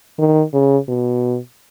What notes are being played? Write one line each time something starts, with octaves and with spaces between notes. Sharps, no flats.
D#3
C#3
B2